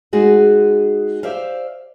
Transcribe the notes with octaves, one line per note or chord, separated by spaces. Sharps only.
G#3 D#4 F#4 G#4
G4 C5 D5 E5 F5